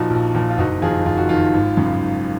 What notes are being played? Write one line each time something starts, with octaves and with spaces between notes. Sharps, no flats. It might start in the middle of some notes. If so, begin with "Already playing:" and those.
Already playing: A#2 F3 D#4 F#4
A#1
A#2 F3
F4
F#1 D#4 F#4
F2 D#3 F4 G#4
F#1 F4
F#4
F2 D#3 F4
G#1
F#2 C#3
G#1